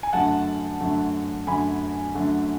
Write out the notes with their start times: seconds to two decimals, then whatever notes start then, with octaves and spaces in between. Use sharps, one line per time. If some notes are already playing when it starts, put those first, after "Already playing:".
0.03 G#5
0.13 F#2 D3 A3 F#5 A5
0.80 F#2 D3 A3
1.47 F#2 D3 A3 G#5 B5
2.15 F#2 D3 A3